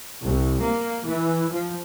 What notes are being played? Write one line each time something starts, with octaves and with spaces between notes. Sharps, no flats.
C2
A#3
E3
F3